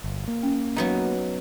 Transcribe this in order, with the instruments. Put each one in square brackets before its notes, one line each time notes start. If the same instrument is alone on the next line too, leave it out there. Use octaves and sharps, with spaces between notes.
[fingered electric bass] G1
A#3
[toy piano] C#4
[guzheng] F#3 B3 D#4 [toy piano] A#5